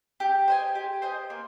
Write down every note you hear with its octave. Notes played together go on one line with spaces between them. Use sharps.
G4
C5 D#5 G#5
G4
C5 D#5 G#5
A#3